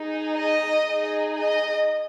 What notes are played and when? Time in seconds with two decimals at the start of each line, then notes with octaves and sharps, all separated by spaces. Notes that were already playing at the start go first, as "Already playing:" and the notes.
Already playing: D#4 G#4
0.37 D#5
0.87 D#4 G#4
1.37 D#5